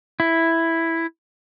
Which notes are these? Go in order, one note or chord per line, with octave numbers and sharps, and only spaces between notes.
E4